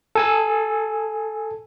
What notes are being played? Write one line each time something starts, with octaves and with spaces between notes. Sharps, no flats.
A4 G#5 E6